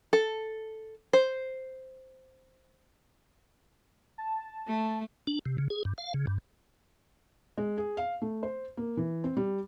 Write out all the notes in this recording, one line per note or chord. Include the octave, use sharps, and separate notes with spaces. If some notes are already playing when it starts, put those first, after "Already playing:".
A4
C5
A5
A3
D4
C3
C#3
G#4
G2
F5
C#3
G2
G#3
G#4
F5
A3
C5
A#3
E3
C4
G3